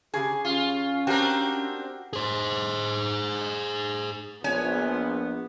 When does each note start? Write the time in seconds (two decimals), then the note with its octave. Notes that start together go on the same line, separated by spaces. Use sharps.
0.14 C#3 G4 G#4
0.45 C#4 F4
1.07 C4 D4 F#4 G4 A#4
2.13 G#4 C5
4.44 A#1 B3 C#5 G#5